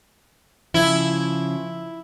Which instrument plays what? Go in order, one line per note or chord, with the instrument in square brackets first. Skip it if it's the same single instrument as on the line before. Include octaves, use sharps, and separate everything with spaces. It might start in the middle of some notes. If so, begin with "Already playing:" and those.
[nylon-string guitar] C#3 F3 [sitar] E4